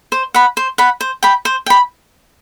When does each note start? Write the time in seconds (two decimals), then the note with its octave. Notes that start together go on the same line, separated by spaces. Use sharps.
0.12 C5
0.34 F#5 B5
0.57 C5
0.78 F#5 B5
1.01 C5
1.23 G5 B5
1.45 C5
1.66 G5 B5